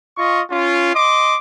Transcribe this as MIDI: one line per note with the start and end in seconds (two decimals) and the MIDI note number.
0.17 0.41 65
0.17 0.41 75
0.17 0.41 85
0.50 0.92 61
0.50 0.92 65
0.94 1.36 75
0.94 1.36 84
0.94 1.36 86